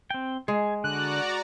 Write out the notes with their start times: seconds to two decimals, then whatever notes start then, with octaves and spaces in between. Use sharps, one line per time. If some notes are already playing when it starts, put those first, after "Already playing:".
0.10 C4 G5
0.48 G#3 G#4
0.84 D3 F#4 D5 A#5 F#6